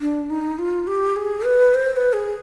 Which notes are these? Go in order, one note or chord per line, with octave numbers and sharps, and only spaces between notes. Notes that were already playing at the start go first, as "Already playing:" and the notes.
D4
D#4
F4
G4
G#4
B4
C5
C5
B4
G#4